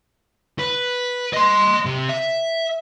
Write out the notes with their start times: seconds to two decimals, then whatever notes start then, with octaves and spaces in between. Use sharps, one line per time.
0.60 B4
1.34 D#5 C6
1.85 C3
2.09 E5